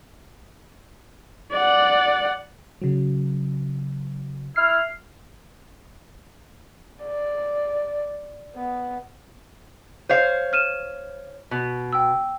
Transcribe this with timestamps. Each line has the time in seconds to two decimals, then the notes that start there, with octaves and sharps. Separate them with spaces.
1.52 D5 F#5
2.81 C#3 F#3
4.56 E4 F6 C7
7.05 D5
8.55 B3
10.09 C5 C#5 F5
10.53 F6 D#7 E7
11.51 B2
11.93 G5 E6